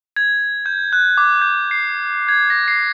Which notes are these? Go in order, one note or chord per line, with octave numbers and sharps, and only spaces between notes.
G#6
G6
F#6
D6
G6
C7
G#6
A#6
C7